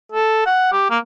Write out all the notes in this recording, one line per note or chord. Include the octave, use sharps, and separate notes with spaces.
A4
F#5
G4
A#3